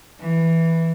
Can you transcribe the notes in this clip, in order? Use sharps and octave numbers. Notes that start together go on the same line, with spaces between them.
E3